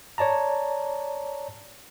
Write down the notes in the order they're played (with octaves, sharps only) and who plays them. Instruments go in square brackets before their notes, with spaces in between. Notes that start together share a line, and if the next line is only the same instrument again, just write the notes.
[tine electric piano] C#5 D5 A5 A#5